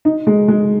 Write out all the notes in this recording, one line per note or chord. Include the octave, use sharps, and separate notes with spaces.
D#4
G#3
G#3